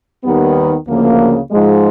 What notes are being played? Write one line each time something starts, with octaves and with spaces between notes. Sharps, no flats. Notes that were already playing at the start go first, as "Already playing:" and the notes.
D#2 D#3 G3 B3
D2 C#3 F3 A#3
G#2 F3 G#3